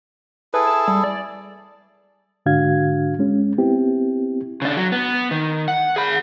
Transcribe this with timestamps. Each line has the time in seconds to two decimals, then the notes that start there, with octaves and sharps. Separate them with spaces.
0.54 E4 G#4 A4 B4
0.67 A5
0.88 G3
1.04 D5
2.46 G#2 D3 D4 F#4 F5 G#6
3.19 G#3 C#4
3.58 B3 C4 E4 G4
4.62 C#3 D4
4.77 F#3
4.92 B3
5.31 D#3
5.68 F#5
5.96 G#4 B5